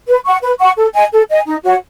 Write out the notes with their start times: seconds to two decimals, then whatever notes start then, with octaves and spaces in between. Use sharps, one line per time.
0.07 B4
0.25 F#5 C#6
0.42 B4
0.60 F#5 C#6
0.76 A4
0.94 D#5 G#5
1.12 A4
1.29 D#5 G#5
1.46 D#4
1.63 F#4 C#5 F#5